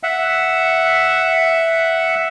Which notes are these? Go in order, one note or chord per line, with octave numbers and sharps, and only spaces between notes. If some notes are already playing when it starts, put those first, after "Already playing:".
E5 F#5